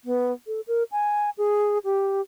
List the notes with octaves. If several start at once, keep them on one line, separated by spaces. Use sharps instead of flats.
B3
A4
A#4
G#5
G#4
G4